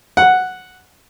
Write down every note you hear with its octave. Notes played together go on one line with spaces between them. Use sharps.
F#5